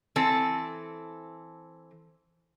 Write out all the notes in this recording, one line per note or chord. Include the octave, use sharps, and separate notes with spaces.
E3 C4 A4